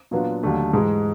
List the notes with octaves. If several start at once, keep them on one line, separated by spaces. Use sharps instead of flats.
A#2 F#3 B3 D4 F4
D#2 D3 F#3 A3 D4
G#2 E3 G#3